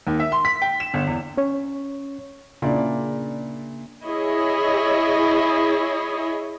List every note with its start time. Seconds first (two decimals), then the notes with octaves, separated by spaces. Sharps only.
0.07 D#2
0.19 E5
0.32 C6
0.45 B6
0.62 G5
0.80 E7
0.94 G1
1.07 E2
1.37 C#4 C#5
2.62 A#2 C#3 D4 E4 D5
4.06 E4 G#4 C#5 D#5